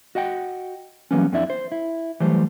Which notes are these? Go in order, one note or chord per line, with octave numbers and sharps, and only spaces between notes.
F#4 D#5 F#5 G5
E3 F#3 G3 A#3 B3 C#4
F2 C4 D4 E4 D5 E5
C5
E4
E3 F#3 G3 A3 C5